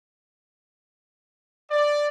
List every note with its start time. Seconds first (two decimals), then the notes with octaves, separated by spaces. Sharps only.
1.70 D5